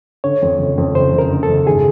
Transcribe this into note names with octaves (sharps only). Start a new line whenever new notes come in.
D3 C#5
F2
F#1
F2
F#1 C5
F#1
A#4
D3
A4
F#1
G#1 G#4